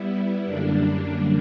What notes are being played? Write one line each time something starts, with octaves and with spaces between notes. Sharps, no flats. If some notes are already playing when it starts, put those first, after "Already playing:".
Already playing: G3 B3 E4
F#2 D3 G3 A#3 D4